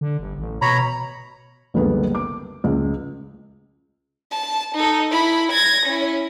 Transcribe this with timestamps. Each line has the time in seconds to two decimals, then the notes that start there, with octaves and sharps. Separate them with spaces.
0.01 D3
0.19 G1
0.38 A1
0.62 B2 C#5 A#5 B5
1.74 F#1 C#2 D3 G3 B3
2.15 D6
2.64 C#2
4.32 A5
4.75 D#4 A4
5.11 E4 B5
5.52 G#6 A#6
5.86 C#4 E4